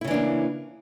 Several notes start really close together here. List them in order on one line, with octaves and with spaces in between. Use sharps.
E4 C#3 E3 D4 A#3